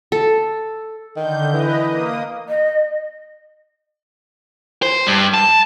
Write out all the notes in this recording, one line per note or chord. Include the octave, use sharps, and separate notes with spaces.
A4
D3 D#3 G6
E3 B4 D#5
A#3 D#6
D#5
C5
G2
A5